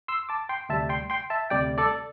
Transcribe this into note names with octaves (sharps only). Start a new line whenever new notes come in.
C6 E6
A5 D6
G5 C6
D2 C3 G3 E5 A5
G5 C6
G5 C6
E5 A5
D2 C3 G3 D5 G5
A4 D5